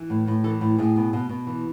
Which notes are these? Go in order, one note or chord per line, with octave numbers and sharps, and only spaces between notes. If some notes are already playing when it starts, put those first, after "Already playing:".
Already playing: E3
A2
A2
E3 A4
A2
A2 G#4
B2
B2
B2
E3